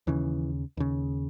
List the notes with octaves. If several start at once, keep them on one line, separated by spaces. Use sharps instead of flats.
D#2 C#3 E3
D#2 C#3